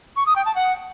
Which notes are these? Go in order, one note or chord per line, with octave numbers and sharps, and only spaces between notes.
C#6
D#6
G5
A5
F#5